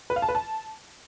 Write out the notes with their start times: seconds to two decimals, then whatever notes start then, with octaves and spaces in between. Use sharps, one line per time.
0.10 B4
0.16 F5
0.22 A5
0.29 B4
0.35 A5